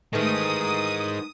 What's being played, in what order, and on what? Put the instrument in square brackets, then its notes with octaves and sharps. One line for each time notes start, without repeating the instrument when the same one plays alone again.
[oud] D#3 E3 A3 [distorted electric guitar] G#3 D#4 [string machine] D#6